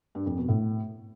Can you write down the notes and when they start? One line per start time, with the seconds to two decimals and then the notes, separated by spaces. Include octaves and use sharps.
0.15 G2
0.26 F2
0.37 B2
0.48 A2